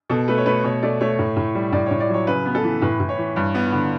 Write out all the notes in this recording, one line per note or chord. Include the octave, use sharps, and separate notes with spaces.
B2 A4
A3 B4
C#5
A3 B4
B2 C#5
A3 D5
A3 C#5
A2
A2
G3
A2 D5
A2 C#5
D5
F#3 C#5
C#3 B4
B3
A4
E3
A2 B4
A2
C#5
E3
G2
B3
D3